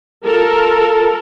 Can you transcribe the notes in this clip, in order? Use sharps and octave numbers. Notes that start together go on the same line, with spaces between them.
F4 A4 A#4